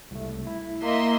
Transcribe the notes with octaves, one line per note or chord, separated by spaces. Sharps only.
C2 A3
E4
A#3 D#5 E5 C6